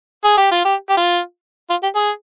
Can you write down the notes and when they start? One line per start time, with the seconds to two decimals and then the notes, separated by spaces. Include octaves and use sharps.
0.24 G#4
0.38 G4
0.52 F4
0.65 G4
0.90 G4
0.97 F4
1.70 F4
1.83 G4
1.96 G#4